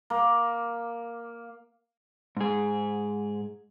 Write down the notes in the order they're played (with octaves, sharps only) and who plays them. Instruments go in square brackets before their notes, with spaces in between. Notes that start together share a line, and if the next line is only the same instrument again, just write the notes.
[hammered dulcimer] A#3
[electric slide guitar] G#2 G#4